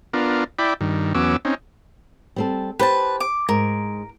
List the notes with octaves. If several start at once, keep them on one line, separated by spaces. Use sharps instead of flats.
B3 D4 F4 A#4
E4 D5 G5 B5
G2 D#3
E2 F#3 B3 C#4 D6 E6
C4 C#4 D#4
G3 C4 A4
G4 B4 C5 A5
D6
G#2 A#4